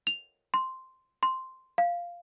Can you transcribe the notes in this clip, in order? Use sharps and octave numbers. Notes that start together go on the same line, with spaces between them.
F7
C6
C6
F5